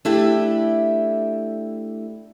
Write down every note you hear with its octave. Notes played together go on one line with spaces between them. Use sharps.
A3 D4 E4 G4 E5